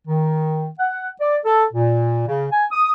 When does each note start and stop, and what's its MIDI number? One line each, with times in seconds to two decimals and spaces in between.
0.08 0.67 51
0.78 1.08 78
1.20 1.38 74
1.45 1.65 69
1.73 2.24 46
2.27 2.47 49
2.52 2.65 80
2.71 2.92 87